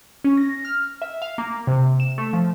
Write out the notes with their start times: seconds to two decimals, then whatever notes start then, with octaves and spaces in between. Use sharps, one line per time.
0.24 C#4
0.37 A#6
0.65 F6
1.02 E5
1.22 F5
1.38 A#3
1.67 C3
2.00 E7
2.18 A3
2.33 F3